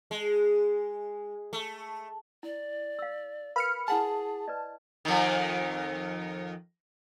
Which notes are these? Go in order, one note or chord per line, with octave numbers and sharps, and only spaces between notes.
G#3
A3
E4 D5
F5 E6
A#4 B4 F5 B5 F6 C#7
E4 G#4 F#5 G#5 A5
B4 D5 D#5
F2 D#3